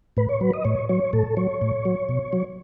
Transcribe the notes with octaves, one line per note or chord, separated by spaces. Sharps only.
A2 B4
C#5
F#3 B4
D#5
A2 C#5
F#3 C#5
A2 A4
F#3 C#5
A2
F#3
B2
F#3